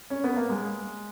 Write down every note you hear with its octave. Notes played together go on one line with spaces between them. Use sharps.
C#4
B3
A#3
G#3